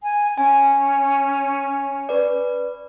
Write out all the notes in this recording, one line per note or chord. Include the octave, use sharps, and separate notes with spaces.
G#5
C#4 G#5
B4 D5